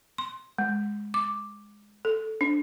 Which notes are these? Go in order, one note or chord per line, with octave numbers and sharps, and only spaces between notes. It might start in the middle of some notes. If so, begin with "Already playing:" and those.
C6
G#3
D6
A4
D4